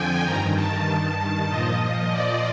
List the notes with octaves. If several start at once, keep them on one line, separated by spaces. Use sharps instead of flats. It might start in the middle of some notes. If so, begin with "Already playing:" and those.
Already playing: F2 D3 F3 G5 G#5
G2 D#3 A#5
A5
A5
A#2 F3 D#5
D5